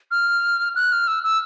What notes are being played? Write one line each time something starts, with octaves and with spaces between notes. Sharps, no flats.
F6
F#6
F6
E6
E6